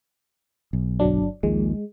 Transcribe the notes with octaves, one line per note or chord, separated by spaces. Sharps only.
B1
G1 F#3 D4
A#1 D#2 A#2 G#3